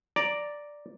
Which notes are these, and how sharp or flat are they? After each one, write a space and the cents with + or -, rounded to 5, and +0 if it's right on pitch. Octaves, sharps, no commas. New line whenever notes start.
D5 +0 A#5 +0